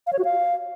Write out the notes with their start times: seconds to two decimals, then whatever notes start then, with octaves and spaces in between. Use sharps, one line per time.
0.07 F5
0.13 C#5
0.19 F#4
0.25 F5